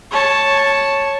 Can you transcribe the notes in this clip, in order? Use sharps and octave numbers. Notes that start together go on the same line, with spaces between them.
C#5 A5